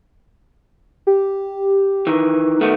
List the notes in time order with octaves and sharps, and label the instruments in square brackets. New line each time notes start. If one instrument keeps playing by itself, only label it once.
[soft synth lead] G4
[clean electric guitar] D#3 E3
D#3 A3 B3